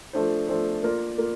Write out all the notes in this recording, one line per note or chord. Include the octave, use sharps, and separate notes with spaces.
F3 A3 D4 A4 C5
F3 A3 D4 A4 C5
A#3 F4 A#4 D5
A#3 F4